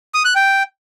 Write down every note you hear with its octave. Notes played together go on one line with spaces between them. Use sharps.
D#6
F#6
G5